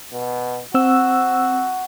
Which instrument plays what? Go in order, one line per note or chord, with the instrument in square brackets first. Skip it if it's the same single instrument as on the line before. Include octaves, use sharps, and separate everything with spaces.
[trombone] B2
[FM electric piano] C4 E6 [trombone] F#4